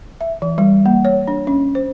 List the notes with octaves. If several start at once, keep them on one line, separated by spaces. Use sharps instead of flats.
E5
E3
G3
A#3
C#5
D4
C#4
C5